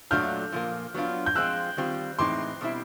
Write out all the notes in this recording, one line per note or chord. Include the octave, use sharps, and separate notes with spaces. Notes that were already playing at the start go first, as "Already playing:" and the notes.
A#2 F#3 A3 D4 F4 F6 G6
A#2 F3 A#3
F#3 B3 D4 F4
G6
F3 G#3 C4 F4 E6 F#6
D#3 G3 C4 F4
A2 E3 G#3 C4 D#4 C6 D6
B2 G3 C4 E4